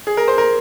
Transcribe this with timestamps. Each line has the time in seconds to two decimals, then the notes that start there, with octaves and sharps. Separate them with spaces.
0.07 G#4
0.17 A#4
0.28 C5
0.38 A#4